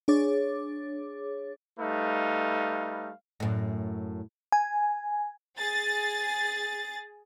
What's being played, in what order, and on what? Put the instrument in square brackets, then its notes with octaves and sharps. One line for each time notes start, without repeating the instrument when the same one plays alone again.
[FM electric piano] D4 G#4 C#5 D6 A6
[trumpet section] G3 A3 D#4 B4 F5
[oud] F#2 A2
[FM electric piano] G#5
[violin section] G#4 A6